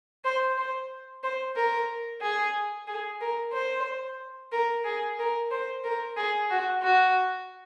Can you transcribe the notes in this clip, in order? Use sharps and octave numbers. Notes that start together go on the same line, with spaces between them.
C5
C5
C5
A#4
G#4
G#4
A#4
C5
A#4
G#4
A#4
C5
A#4
G#4
F#4
F#4